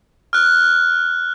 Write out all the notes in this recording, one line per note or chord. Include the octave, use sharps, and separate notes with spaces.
F6 F#6